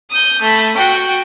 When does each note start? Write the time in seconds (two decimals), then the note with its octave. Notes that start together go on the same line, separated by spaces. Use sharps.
0.11 D#6 G6
0.42 A3 B5
0.76 F#4 G5